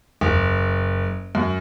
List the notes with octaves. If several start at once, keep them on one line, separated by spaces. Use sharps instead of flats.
F#1
F#2